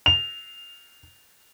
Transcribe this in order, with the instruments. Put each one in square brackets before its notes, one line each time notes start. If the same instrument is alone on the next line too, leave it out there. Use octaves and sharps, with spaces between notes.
[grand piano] F7